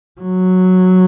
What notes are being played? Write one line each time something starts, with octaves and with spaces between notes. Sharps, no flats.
F#3